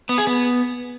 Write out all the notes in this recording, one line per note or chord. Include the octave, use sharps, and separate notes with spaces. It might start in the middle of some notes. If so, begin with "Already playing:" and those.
B3
G#4
B3